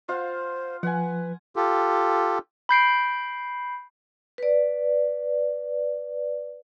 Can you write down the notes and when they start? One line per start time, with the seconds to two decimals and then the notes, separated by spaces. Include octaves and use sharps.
0.09 F4 C5 F5 F#5
0.83 F3 B4 F#5 G#5
1.56 F4 G4 A4
2.69 B5 G6 C7 D7
4.38 B4 D5